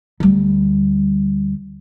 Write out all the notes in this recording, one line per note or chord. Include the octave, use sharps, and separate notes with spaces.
D2 G3